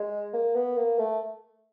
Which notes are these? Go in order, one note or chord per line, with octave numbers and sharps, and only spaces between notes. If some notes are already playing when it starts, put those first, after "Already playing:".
Already playing: G#3
A#3
B3
A#3
A3